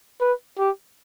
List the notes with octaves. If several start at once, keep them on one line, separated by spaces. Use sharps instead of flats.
B4
G4